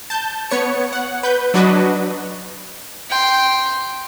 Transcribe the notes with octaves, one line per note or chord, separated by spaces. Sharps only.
A5 G6
B3 C#5 C#7
F#5
B4 G6
F#3 D4 F#4 B4 D#5
G5 C6